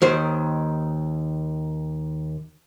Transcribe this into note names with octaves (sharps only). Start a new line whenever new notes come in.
D#2 D#3 C5